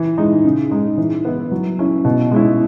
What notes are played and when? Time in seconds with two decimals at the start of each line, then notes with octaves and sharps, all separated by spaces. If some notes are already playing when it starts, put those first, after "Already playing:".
Already playing: E3
0.18 G#3 D#4
0.44 C#3
0.71 G#3 D#4
0.98 E3
1.25 B3 E4
1.51 F#3
1.79 C#4 E4
2.05 B2
2.32 G#3 C#4 E4